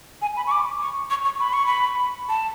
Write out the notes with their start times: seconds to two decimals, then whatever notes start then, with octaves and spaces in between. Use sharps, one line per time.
0.22 G#5
0.37 B5
0.47 C#6
0.51 D6
0.81 C#6
1.10 C#6
1.25 C#6
1.40 B5
1.53 C#6
1.67 B5
2.29 A5